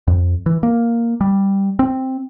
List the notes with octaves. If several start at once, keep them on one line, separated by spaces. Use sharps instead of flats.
F2
E3
A#3
G3
C4